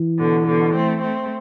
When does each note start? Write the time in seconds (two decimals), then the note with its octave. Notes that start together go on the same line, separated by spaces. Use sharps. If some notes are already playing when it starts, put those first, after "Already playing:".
Already playing: E3
0.19 B2 D3
0.47 B2 D3
0.76 A3 C4
1.03 A3 C4